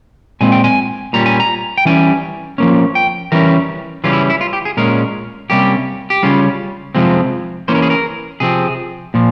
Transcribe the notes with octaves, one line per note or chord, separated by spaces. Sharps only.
A#2 G#3 C4 G#5
G5
G#5
A#2 G3 C#4 A#5
G#5
A#5
G5
E3 G3 C#4 G#5
F3 A#3 C#4
G5
E3 G3 C#4 A#4
C#3 E3 G3 C#4 F4
E4
E4
F4
G4
G#4
A#2 G#3 C#4 A#4
C3 G3 A#3 C#4 G4
G4
C#3 G3 C#4 F4
C3 F3 G#3 C4
E3 A#3 C#4 C5
A#4
G#4
A#4
C3 F3 C4 G#4
A#2 F3